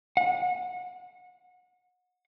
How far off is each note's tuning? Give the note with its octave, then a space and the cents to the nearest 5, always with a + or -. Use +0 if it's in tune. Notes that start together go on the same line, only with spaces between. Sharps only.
F#5 -30